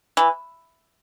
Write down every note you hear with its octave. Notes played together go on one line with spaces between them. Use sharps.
E3